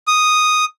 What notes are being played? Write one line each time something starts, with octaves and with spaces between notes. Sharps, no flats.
D#6